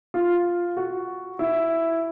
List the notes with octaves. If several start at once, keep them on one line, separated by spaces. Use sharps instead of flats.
F4
F#4
E4